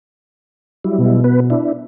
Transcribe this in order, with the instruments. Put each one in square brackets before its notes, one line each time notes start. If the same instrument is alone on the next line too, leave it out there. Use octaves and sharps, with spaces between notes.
[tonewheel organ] F#3 G3 E4
[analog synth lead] B2
[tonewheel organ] B3 B4
D4 E4